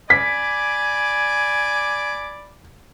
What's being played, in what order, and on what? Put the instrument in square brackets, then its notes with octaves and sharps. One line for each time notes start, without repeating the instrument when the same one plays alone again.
[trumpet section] D5 B5 D6 [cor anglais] G#5 [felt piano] B6